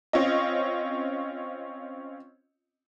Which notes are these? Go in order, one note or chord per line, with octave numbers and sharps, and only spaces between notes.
C4 C#4 F4 D#5